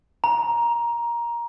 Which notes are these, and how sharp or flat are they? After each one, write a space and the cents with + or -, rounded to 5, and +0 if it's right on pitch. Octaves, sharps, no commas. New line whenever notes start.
A#5 +15